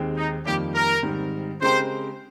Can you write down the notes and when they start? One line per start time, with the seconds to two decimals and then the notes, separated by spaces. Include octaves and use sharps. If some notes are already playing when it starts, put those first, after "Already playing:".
Already playing: D#2 D#3 G#3 C4 G4
0.17 D#4
0.46 F2 D#3 G3 A#3 G4
0.75 A#4
1.03 G#2 D#3 G3 C4
1.61 C#3 G#3 C4 G4 A#4 C5